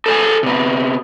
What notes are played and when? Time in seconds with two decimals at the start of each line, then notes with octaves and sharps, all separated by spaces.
0.06 A4 C5 G#5
0.43 C3 B3